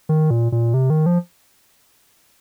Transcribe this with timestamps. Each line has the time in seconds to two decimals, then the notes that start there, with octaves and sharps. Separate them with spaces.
0.09 D#3
0.31 A#2
0.52 A#2
0.74 C3
0.90 D#3
1.06 F3